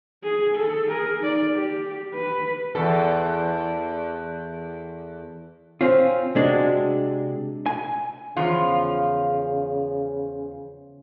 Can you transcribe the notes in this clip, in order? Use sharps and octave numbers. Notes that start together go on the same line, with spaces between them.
G#4
A4
G#4 A#4
D#4 D5
G4
B4
E2 A4
C4 C#4 F4
C3 G#3 D4 F#4
G#5
E2 C#3 F3 F4